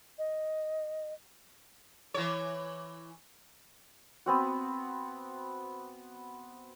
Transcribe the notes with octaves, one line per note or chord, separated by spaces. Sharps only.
D#5
E3 C#5
B3 C4 F#4